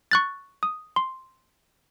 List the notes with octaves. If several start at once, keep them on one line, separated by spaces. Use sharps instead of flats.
C#6 F#6 A6
D#6
C6